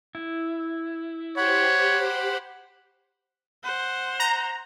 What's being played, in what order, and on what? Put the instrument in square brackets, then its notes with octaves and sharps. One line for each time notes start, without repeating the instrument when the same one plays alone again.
[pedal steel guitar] E4
[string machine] G4 C5 [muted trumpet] C#5 [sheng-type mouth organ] F#5 B5
[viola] C5 F#5
[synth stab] A#5